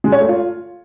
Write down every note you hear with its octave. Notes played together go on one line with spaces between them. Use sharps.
G#3
C#5
A3
F4